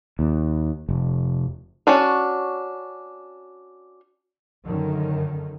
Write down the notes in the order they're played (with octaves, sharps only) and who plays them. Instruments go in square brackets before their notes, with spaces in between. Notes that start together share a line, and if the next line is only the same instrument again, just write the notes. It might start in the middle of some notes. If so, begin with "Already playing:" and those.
[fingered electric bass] D#2
F1
[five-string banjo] C#4 D4 F#4 D5
[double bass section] F#2 D3 D#3